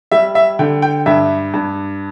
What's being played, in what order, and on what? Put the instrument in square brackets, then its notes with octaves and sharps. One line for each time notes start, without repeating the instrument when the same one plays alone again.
[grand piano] G3 E5
E5
D3 G5
G5
G2 E5
G2